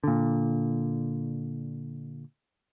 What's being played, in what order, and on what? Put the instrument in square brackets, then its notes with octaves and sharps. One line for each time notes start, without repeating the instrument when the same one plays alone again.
[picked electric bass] A#2 D3